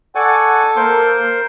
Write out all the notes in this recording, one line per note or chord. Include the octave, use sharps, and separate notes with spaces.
A4 D5 F#5 G#5 C#6
A#3 A#4 C5 C6